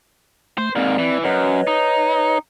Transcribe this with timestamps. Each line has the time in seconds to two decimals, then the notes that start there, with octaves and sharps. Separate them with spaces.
0.58 A3 C5
0.76 G#2 A#3 C4 D5
0.99 E3
1.24 F#2 B4 C#5 D#5
1.67 D#4